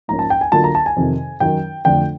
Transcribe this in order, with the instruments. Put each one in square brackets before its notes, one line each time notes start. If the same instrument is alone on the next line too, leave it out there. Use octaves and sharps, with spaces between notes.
[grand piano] G#2 F3 A#3 C#4 A#5
A5
G5
G#5
D3 F#3 A#3 D4 F4 A5
A#5
A5
G#5
F2 C3 D#3
F#2 D#3 F#3 G5
F2 D3 F3 A3 D4 G5